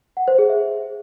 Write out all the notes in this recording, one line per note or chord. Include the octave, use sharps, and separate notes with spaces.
F#5
C5
G#4
E5